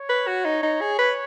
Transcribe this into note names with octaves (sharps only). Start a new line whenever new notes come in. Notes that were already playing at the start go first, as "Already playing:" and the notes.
Already playing: C#5
B4
F#4
D#4
D#4
G#4
B4